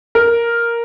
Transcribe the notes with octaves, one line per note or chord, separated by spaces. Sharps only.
A#4